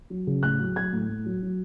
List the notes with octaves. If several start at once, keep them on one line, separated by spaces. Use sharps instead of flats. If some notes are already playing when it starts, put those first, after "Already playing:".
F#3
C#3
A2 F#6
F#3
F#3 G#6
A2
A2
F#3
F#3